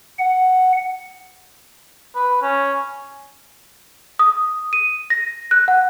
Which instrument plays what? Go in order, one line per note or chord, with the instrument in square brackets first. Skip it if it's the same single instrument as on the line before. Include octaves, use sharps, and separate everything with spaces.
[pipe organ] F#5
[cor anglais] B4
C#4
[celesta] D#6
D#7
A#6
F#6
F#5